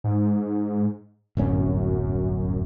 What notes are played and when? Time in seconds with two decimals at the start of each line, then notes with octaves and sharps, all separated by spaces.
0.04 G#2
1.37 D1 G1 F#2 C#4